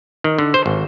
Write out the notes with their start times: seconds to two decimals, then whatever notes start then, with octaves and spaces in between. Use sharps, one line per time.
0.24 D#3
0.39 D3
0.54 C5
0.66 G#1